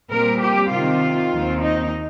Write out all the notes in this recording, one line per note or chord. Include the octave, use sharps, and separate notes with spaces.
A#2 G3 C4 A#4
G4
C3 D#3 C4 F4
D#2 D#3 C4
D#4